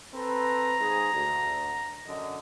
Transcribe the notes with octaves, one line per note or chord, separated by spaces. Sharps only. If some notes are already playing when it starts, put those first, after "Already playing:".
C4 A4 B4 A#5
G#2 G#4
D2
F#2 D3 D#5